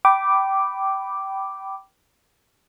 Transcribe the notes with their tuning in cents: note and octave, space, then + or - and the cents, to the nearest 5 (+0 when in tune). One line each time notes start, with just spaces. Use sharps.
G5 -20 B5 +0 D6 +0